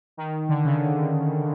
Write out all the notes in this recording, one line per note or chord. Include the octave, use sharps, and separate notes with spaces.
D#3
D3
C#3